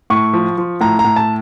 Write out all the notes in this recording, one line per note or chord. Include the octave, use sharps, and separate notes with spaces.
A2 C#6
F3
F3
A2 A#5
A#5
A2
A5